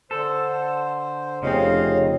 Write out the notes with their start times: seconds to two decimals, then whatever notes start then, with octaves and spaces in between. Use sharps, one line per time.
0.11 D3 A4 C5
1.43 F1 C#3 C4 C#5 D#5 F5